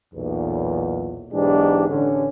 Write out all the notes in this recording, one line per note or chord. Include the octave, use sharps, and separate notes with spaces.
B1 E2 A#2
B1 G#2 E3 G#3 D4 G4
A1 D3 C#4